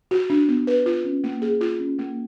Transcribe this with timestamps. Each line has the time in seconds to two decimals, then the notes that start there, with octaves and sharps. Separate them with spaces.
0.11 F#4
0.30 D4
0.48 B3
0.67 B4
0.86 F4
1.04 C#4
1.24 A#3
1.42 G#4
1.61 F4
1.80 C#4
1.99 A#3